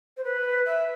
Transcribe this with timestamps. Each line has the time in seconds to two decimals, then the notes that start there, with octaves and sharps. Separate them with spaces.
0.17 C5
0.24 B4
0.65 E5